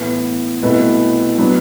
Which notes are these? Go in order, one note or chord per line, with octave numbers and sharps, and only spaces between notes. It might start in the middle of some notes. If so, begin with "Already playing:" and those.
Already playing: A2 E3 B3
C2 B2 A3 E4 B4
F#3 B3 D4